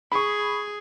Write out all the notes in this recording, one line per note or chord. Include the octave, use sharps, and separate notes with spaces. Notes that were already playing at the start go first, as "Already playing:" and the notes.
G#4 B5 C#6